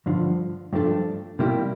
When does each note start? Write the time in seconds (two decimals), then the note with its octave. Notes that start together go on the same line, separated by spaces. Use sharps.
0.06 G2 D3 F3
0.73 G2 F3 A3 D4 A4
1.39 C3 G3 A#3 E4 G4